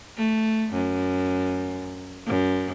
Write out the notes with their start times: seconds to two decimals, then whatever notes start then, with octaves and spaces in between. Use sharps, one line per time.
0.17 A3
0.73 F#2
2.26 F#2